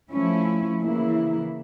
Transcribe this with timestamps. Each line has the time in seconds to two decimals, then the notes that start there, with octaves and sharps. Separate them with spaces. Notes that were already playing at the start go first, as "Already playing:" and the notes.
0.10 F3 A3 C#4 E4
0.82 C#3 E3 A#3 E4